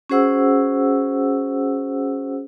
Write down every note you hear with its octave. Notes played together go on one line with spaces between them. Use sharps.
C#4 F#4 G#4 C5 F#5 E6